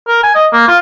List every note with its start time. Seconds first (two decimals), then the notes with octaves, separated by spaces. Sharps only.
0.08 A#4
0.23 G#5
0.35 D#5
0.53 A#3
0.68 F4